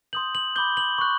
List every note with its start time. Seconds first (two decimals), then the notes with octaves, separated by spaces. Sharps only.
0.13 C6 D#6 G6 F#7
0.35 F#7
0.56 B5 D6 G6 G7
0.77 F#7
0.98 C#6 F#6